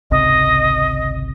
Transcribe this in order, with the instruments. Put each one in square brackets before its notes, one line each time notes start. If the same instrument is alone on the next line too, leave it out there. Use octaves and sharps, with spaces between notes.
[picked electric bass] G#1 C#2 C3 [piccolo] D#5